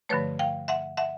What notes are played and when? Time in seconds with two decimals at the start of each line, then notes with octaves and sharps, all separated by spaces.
0.09 G2 D3 F3 A3 B4 C#5
0.39 F5 G5
0.68 E5 F#5
0.97 E5 F#5